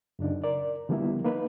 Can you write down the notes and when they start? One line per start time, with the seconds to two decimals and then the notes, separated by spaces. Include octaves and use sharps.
0.19 F#2 C#3 D4 D#4
0.44 A#4 D5
0.89 D3 F3 G3 A#3 B3 E4
1.24 A#3 D#4 B4